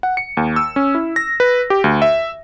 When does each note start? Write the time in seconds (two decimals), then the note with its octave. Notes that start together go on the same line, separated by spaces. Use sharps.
0.03 F#5
0.17 C#7
0.37 D#2
0.56 E6
0.76 C#4
0.95 E4
1.16 A#6
1.40 B4
1.70 G4
1.84 D2
2.02 E5